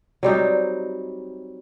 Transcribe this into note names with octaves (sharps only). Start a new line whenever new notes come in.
F#3 G3 C4 D#4